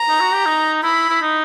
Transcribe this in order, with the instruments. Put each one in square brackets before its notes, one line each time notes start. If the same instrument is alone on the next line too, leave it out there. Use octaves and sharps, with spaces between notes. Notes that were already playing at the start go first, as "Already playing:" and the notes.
Already playing: [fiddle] A#5
[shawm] D#4
F#4
G4
D#4
[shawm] E4 [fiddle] B5
[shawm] E4
D#4